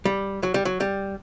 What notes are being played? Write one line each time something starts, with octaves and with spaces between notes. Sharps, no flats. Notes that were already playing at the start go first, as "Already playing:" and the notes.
G3
F#3
G3
F#3
G3